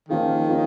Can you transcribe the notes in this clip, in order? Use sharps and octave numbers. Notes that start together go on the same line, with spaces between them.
D#3 F3 A#3 C#4 F4 G#4
C#4 F4 G#4